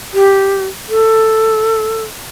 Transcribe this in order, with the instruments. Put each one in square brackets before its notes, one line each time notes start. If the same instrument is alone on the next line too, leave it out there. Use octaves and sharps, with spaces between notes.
[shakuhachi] G4
A4